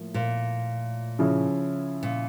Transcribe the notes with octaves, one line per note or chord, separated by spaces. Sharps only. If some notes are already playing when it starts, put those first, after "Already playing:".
Already playing: A2 F3 A#3
A#2
C#3 F3 C#4 E4
A#2